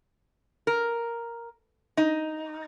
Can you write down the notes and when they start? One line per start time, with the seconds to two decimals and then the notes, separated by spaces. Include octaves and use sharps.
0.67 A#4
1.97 D#4